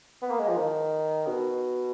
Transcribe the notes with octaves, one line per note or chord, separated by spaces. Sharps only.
B3
A#3
G#3
F3
D#3
B2